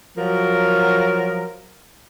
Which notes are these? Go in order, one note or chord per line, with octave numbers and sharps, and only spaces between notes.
F3 F#3 A#4